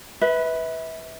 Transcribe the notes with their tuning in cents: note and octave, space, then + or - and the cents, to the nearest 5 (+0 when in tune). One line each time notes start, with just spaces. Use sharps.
B4 +0 E5 -30